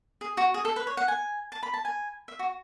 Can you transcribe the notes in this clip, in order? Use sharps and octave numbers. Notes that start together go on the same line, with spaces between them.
G#4
F#4
G#4
A4
B4
C#5
F#5
G#5
A5
B5
A5
G#5
E5
F#4